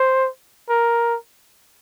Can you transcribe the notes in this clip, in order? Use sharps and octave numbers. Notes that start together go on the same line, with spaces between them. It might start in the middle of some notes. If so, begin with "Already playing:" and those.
Already playing: C5
A#4